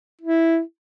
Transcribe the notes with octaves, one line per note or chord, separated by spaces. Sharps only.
E4